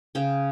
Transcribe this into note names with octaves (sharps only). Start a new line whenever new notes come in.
C#3 G5